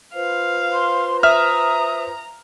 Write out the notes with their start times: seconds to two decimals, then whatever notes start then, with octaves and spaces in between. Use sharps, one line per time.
0.14 F4 B4 C5 F5
0.73 C6
1.23 E5 A#5 D#6 F6